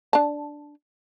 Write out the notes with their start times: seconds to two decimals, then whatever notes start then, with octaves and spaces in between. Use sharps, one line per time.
0.13 D4 A5